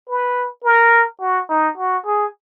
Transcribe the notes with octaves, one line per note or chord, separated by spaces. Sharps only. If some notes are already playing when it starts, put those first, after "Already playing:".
B4
A#4
F#4
D#4
F#4
G#4